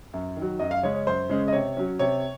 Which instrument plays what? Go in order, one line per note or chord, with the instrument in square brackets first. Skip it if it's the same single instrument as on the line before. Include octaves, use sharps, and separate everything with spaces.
[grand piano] F#2
D#3 F#3
F#2 D#5
F5
C#3 G#3 C#4 C#5
C#5
F#2 C5
C#3 G#3 C#4
D#5
C3 C#5
F#3 C#4
C3 C#5